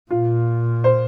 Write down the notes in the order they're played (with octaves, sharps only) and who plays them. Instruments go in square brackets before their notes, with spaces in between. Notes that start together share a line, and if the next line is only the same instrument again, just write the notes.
[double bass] A#2 [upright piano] F4
[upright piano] C5